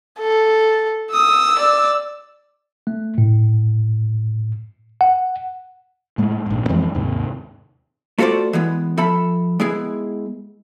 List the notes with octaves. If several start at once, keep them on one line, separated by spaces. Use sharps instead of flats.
A4
D#6 E6
D5
A3
A2
F#5
A2 G#3 A3
A#1 G#2
F2 E3 F3 G#3
D#2 G#2 C3
A3 F4 F#4 A#4 C5 D5
E3 G#3 B3
F3 A4 E5 B5
G#3 B3 E4 G#4